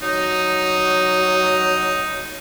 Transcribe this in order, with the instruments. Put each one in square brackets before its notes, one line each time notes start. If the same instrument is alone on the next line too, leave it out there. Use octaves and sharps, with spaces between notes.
[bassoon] F#3 [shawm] D#4